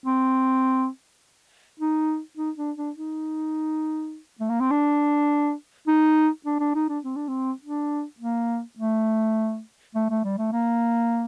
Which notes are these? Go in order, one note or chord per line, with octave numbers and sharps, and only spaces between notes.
C4
D#4
D#4
D4
D4
D#4
A3
A#3
C4
D4
D#4
D4
D4
D#4
D4
C4
D4
C4
D4
A#3
A3
A3
A3
G3
A3
A#3